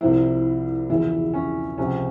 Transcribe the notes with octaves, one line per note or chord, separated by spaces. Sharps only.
C2 C3 F3 E4
E1 E2 C#3 F3 E4
C#4
C#2 C3 F3 C#4